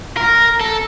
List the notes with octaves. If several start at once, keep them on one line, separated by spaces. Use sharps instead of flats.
A#4
A4